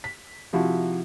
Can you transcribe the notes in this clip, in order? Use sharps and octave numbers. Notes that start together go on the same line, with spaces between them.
B6
C3 F3 E4 F#4